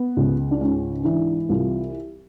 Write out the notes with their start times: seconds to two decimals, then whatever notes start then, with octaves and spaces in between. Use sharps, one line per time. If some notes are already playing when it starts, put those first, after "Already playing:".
Already playing: B3
0.17 C#2
0.51 D4
0.61 G#2 C#4
1.04 E3 D4
1.49 C2 F4